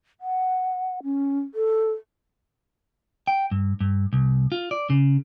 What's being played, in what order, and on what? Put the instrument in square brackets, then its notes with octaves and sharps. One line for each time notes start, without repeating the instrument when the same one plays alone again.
[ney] F#5
C#4
A4
[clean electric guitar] G5
G2
G2
C2
F4
D5
C#3